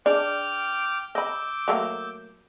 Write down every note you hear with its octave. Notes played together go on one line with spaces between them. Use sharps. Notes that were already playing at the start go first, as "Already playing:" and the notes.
D4 G#4 D5 G5 D6 F6
D#5 B5 D6 E6 G6
F#3 A3 A#3